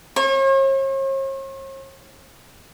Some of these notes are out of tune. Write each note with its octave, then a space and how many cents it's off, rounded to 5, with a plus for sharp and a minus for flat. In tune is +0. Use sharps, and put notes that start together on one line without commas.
C#5 -45